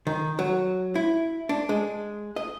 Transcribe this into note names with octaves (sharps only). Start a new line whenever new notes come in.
D#3
F#3
E4
D4
G#3
D#5